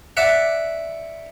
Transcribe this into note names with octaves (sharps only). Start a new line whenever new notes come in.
D5 E5 F#5